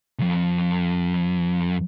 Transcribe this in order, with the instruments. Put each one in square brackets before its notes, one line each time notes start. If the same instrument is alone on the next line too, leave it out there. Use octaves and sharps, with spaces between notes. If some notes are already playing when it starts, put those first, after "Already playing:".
[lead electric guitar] C2 F2